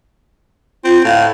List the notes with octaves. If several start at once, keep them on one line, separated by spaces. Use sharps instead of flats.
C4 F4
A2 F5